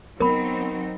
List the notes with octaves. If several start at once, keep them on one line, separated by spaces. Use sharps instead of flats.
F#3 B3 C4 D#4 A#4 B5